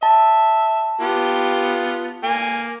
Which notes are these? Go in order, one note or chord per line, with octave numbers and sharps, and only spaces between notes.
E5 A5
B3 F4 G4
A#3 G#5